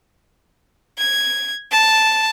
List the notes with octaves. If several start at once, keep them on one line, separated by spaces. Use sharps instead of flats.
G#6
A5